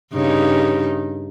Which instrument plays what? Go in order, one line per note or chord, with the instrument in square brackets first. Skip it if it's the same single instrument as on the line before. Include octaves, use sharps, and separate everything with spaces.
[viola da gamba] G2 C#3 D#4